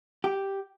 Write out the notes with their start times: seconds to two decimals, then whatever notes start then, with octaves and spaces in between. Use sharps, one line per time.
0.24 G4